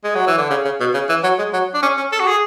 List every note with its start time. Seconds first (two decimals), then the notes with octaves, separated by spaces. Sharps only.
0.04 G#3
0.15 F#3
0.27 E3
0.38 D3
0.50 C#3
0.65 C#3
0.80 B2
0.94 C#3
1.09 E3
1.23 F#3
1.38 G#3
1.53 F#3
1.74 D4
1.82 C#4
1.97 C#4
2.12 A4
2.20 F#4
2.27 G#4